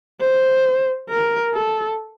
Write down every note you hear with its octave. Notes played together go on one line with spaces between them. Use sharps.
C5
A#4
A4